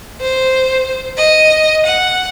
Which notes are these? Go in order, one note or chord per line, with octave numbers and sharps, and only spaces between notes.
C5
D#5
F#5